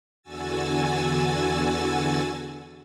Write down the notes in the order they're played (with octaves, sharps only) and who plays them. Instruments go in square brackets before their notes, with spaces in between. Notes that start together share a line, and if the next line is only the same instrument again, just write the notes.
[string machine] E2 D3 F#4 G#5 E6 A6